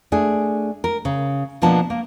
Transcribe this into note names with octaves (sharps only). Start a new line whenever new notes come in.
A3 D4 G#4
A#4
C#3
B2 F3 A#3 B3 D4 A5
A#3